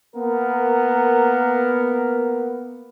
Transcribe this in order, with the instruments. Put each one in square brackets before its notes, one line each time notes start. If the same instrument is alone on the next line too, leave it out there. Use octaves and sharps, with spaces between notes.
[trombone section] A#3 B3 A#4